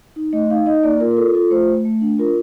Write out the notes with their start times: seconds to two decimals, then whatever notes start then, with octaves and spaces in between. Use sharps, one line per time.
0.16 D#4
0.33 A3 D#5
0.50 D#4 F5
0.66 D#4 D#5
0.83 A#3 D5
1.00 F4 A#4
1.11 A#4
1.17 F4 A4
1.34 F4 A4
1.51 A3 C5
1.68 A3
1.85 A3
2.01 D4
2.18 F4 A#4